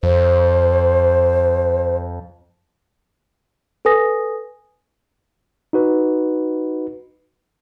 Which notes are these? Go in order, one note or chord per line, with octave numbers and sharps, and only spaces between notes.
F2 C5
A4 B4 G#5 D#6 A#6
D#4 F#4 B4